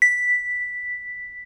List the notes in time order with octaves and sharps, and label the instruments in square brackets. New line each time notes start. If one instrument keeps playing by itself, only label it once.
[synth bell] B6